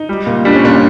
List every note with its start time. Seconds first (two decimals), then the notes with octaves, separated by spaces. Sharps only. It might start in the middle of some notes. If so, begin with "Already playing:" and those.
Already playing: D#4
0.09 G3
0.27 A#2
0.45 G3 D4
0.55 C#4
0.64 A#2 D4